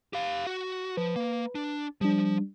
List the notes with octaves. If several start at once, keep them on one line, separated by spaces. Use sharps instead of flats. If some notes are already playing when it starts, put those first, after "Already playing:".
G4 F5
F#4
F3 B4
A#3
D4
F3 G3 D4